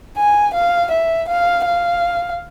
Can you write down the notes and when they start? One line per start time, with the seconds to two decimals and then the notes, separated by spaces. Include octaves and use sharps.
0.17 G#5
0.54 F5
0.91 E5
1.28 F5
1.65 F5